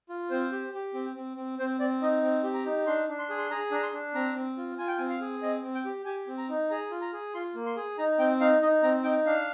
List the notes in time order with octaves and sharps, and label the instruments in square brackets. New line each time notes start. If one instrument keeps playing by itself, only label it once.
[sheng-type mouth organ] F4
C4 C5
G4
G4
C4
C4
C4
C4 C5
C4 D5
D#4 D#5
C4
G4
A#5
D#4
D4 C6
D4
C6
G#4
C6
G#4 A#5
D4 A#5
C6
D4
C4 A#5
C4
F4
F4 G#5
G5
C4 G#5
F5
G#4
C4 D#5
C4
G5
G4
G4 G#5
C4
A#5
D#4
G#4 A#5
F4
A#5
G#4
F4 C6
A#3
C6
G#4
D#4 A#5
C4 G5
D#4 F5
D#4 D#5
C4 A#5
D#4 G5
D4 F5